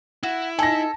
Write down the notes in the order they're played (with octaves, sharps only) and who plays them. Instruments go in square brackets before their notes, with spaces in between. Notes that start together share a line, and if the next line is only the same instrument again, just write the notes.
[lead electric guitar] E4 [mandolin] F#4
[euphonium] D#4 [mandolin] A4 [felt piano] G#5 A#6